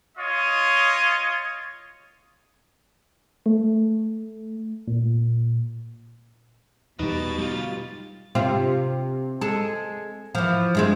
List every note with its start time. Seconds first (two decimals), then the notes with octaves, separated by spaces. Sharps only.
0.18 F4 C#5 D#5
3.46 A3
4.87 A#2
6.99 E2 B2 G3 D#4 B4 D#5 A6
7.38 D2 G3 F4
8.35 C3 C4 F4
9.41 G#3 A4
10.35 E3 F3
10.75 G2 G#3 C4